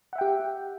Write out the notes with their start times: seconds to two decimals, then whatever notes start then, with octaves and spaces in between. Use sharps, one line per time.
0.13 F#5
0.16 E5
0.18 G5
0.21 G4